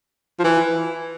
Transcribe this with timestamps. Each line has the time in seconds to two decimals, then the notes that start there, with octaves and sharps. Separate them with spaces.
0.40 F3
0.44 E3